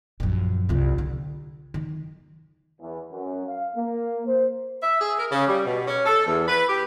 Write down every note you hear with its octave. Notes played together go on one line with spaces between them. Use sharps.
A#1 F#2
C2 F4
D3
D#3
E2
F#2
F5
A#3
C5
E5
G#4
A#4
C#3
G3
B2
C#4
A4
E2
B4
G4